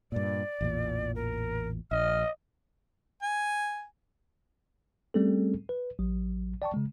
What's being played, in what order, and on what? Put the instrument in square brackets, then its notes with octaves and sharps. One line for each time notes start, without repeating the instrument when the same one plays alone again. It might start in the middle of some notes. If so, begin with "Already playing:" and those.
[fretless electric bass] G2 A#2 [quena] D5
[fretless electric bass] A1 E2 A#2
[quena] A#4
[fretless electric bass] A#1 [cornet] D#5 [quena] F6
[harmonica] G#5
[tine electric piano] G3 A3 C4 C#4 G#4 A4
B4
A1 F#3
D5 G5 A5 C#6
C#3 G#3